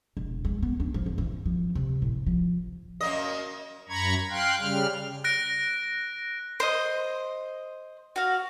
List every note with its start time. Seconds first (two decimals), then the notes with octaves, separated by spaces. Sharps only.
0.17 E1
0.45 G#3
0.63 B3
0.80 D4
0.94 F3
1.06 F2
1.18 E3
1.46 F3
1.75 C3
2.02 A2
2.26 F3
3.01 F#2 A#3 D#5
3.89 F#2 A#5 B5 C#6 G#6
4.30 F5 G5 C6 F#6
4.60 C#3 G3 F6
5.24 F#6 A#6 D7
6.60 C5 D#5
8.16 F#4 F5